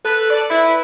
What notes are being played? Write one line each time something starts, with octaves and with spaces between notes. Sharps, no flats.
A4 B4
D5
E4 B4